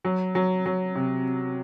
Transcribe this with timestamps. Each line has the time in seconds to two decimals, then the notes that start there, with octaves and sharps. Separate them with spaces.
0.05 F#3
0.35 F#3
0.66 F#3
0.95 C3